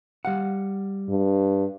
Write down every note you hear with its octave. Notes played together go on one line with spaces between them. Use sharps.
G3 F5 F#5
G2